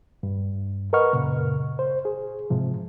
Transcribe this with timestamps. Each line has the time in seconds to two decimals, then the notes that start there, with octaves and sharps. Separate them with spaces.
0.23 G2
0.93 A#4 B4 D#5 F#5 C#6 F6
1.13 F#2 A#2 C#3
1.79 C5
2.05 G#4
2.50 G#2 C3 F3